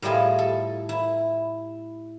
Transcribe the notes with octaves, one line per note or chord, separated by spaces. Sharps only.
A2 G3 E4 F4 G#4 D#5
A4
E4